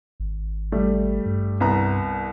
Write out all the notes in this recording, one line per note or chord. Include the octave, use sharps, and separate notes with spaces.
G#1
G3 A3
G2
C2 B3 A#5